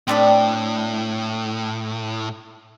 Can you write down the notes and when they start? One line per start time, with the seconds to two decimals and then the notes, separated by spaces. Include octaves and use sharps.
0.07 A2 C4 D4 B4